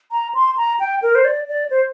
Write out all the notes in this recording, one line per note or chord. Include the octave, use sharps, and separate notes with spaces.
A#5
C6
A#5
G5
A#4
C5
D5
D5
C5